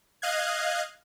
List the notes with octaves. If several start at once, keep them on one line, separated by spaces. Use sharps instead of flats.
D#5 F5 F#6 G#6